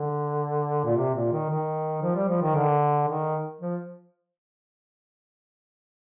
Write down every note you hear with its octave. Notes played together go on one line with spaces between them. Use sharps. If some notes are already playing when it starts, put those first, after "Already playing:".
Already playing: D3
A#2
C3
A#2
D#3
D#3
F3
G3
F3
D#3
D3
D#3
F3